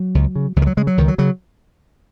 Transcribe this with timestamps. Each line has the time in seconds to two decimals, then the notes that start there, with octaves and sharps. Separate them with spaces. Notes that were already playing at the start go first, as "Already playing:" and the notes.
Already playing: F#3
0.15 C#2
0.36 C#3
0.56 C#2 F#3
0.62 D#3
0.67 F#3
0.77 C#3 G#3
0.87 F#3
0.98 C#2 D#3
1.08 F#3
1.18 C#3 F#3